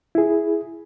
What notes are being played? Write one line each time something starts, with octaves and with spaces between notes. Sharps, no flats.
E4 G#4